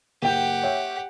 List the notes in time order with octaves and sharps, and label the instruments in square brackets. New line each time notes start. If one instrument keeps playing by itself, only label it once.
[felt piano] F#1 G5 [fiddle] G4 F#5
[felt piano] C#5 E5 G5